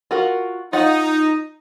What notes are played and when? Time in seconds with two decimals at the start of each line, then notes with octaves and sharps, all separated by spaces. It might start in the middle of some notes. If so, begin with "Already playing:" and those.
0.11 F4 F#4 A#4
0.73 D#4 F4 F#5